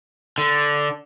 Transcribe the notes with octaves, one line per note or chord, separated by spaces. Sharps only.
D3